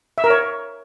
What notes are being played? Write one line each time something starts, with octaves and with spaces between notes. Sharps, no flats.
E5
A#4
C#5